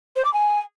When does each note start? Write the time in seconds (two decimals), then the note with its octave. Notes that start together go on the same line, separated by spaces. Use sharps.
0.16 C5
0.25 D6
0.33 G#5